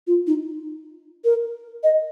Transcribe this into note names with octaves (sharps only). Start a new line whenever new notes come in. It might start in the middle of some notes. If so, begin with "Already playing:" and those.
F4
D#4
A#4
D#5